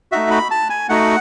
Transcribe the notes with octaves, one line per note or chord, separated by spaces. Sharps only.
A3 D#4 F#4 E5
B5
A5
G#5
A3 D#4 F#4 F#5